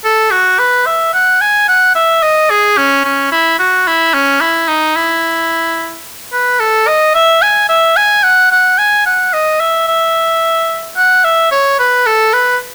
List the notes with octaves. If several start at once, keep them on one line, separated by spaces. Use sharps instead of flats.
A4
F#4
B4
E5
F#5
G#5
F#5
E5
D#5
G#4
C#4
C#4
E4
F#4
E4
C#4
E4
D#4
E4
B4
A4
D#5
E5
G#5
E5
G#5
F#5
F#5
G#5
F#5
D#5
E5
E5
F#5
E5
C#5
B4
A4
B4